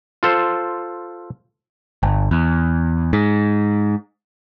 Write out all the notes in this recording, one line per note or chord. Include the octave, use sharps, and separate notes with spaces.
F4 A4 C5
G1
E2
G#2